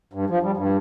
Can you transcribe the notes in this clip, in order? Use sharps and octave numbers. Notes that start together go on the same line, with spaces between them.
G2
F3
G3
G2